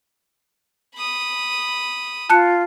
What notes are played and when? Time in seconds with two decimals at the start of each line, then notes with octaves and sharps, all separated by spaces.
0.96 B5 D#6
2.30 F4 A5 F#6 C#7